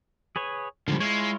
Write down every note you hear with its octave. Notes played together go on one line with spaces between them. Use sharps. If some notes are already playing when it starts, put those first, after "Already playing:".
G#4 B4 C#5
C#2 D3 F3 G3
G#3 E4 F4 C#5